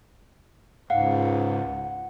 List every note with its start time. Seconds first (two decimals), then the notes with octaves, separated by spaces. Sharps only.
0.90 C#2 G#2 F5 F#5